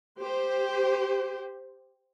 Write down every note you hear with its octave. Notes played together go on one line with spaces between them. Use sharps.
G4 C5